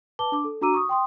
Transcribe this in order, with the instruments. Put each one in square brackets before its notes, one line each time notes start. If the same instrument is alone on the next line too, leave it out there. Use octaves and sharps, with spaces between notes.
[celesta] B4 A5 D6 G7
D4 D6
A4
D4 F#4 A#5 D6 E6 D#7
C#6 D#6
G5 C6 D#6